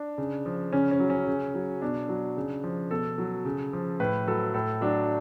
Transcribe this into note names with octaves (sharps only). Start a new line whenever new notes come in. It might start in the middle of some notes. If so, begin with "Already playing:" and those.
Already playing: D4
C#3
F3
C#3 C#4
C#4
F#3
C#4
C#3
F#3
B2 D4
F#3
C#3
F3
B2 A4
F#3
C#3
F3
A2 B4
F#3 A4
A2 A4
F#3 D4